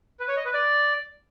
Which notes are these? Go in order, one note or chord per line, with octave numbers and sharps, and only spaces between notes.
B4
C#5
D#5
B4
D5